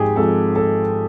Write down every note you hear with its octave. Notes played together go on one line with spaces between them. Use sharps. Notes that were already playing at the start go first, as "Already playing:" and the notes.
Already playing: G#1 G#2 F3 G4 G#4
G#1 G#2 F3 A4
A4